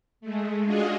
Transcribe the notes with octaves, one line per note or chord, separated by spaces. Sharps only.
G#3 A3
D4 F4 F#4 G#4 D#5